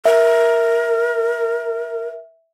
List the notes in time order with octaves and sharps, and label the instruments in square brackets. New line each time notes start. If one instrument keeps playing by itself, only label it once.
[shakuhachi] A#4 [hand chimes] E5